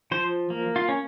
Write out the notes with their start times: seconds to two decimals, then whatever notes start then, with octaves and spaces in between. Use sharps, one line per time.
0.11 F3 C5
0.50 A#3
0.76 F4
0.89 C#4